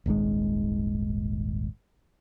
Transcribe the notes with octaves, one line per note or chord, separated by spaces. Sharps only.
D#1 G#1 G#2 G#3